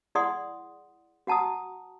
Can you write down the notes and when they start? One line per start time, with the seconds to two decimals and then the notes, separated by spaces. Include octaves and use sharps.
0.15 E4 G#4 D5 F#5 C6 D#6
1.27 F#4 F#5 A5 A#5 D#6